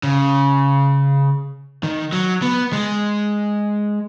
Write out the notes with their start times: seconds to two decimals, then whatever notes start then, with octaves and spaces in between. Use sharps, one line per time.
0.03 C#3
1.83 D#3
2.13 F#3
2.42 B3
2.73 G#3